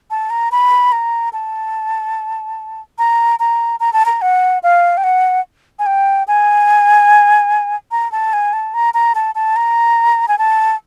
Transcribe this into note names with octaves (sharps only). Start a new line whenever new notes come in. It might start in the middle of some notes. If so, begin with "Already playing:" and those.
A5
A#5
B5
A#5
A5
A#5
A#5
A#5
A5
A#5
F#5
F5
G5
F#5
G#5
G5
G#5
A#5
A5
G#5
A5
A#5
A#5
A5
A5
A#5
G#5
A5